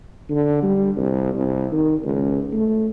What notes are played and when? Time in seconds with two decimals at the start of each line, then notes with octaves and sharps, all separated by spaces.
0.30 D3
0.63 G3
0.96 C2
1.34 C2
1.72 D#3
2.04 C#2
2.53 A3